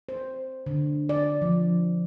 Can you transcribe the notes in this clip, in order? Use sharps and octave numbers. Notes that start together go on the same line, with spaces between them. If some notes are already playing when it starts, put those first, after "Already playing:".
C5
D3
D5
F3